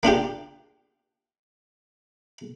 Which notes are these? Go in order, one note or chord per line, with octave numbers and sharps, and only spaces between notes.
A#3 D4 F4 G4